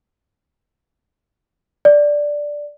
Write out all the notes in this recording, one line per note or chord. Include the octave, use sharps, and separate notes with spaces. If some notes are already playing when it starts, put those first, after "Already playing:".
D5